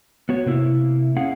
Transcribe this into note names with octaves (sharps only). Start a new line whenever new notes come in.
B3 F#4 C#5
C3 A#3 E4
C#4 E4 G#4 F5 F#5